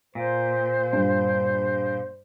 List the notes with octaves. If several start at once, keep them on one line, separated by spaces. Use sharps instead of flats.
A#2 C5
G2